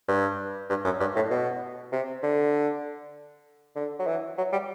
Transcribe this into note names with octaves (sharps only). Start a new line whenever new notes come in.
G2
G2
F#2
G2
A2
B2
C3
D3
D3
F#3
E3
F#3
G3